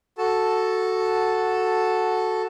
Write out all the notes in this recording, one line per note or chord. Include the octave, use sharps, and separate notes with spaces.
F#4 A4 A5